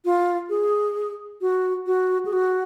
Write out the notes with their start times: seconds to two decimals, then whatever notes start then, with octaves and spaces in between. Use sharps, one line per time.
0.05 F4
0.50 G#4
1.41 F#4
1.86 F#4
2.25 G#4
2.33 F#4